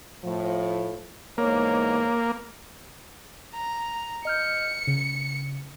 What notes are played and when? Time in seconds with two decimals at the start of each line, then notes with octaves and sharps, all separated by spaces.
0.24 A2 F3
1.38 E2 G#2 A#3 C#5
3.54 A#5
4.25 D#5 F6 G6 C#7
4.87 C#3